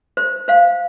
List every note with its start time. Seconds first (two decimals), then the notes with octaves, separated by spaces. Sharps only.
0.17 C5
0.48 C5 F5